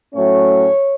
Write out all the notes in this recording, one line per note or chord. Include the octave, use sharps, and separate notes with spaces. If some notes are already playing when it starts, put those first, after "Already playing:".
A2 F#3 A3 C#4 C#5